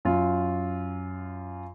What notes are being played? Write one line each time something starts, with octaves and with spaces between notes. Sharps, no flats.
F#2 F4